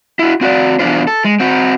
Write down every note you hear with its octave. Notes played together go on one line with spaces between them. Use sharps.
E4 F#4
C4 F#4 B4 D5
E2 B2 F3 D4 F4 C5
A4
G#3
C4 F#4